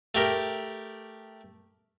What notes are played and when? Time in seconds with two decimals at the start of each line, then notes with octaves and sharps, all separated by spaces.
0.15 A3 G4 A#4